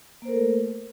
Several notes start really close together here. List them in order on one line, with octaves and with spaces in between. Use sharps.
A#3 C5 A#4 A4 A3